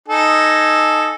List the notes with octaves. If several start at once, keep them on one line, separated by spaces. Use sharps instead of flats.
D#4 A4 G#5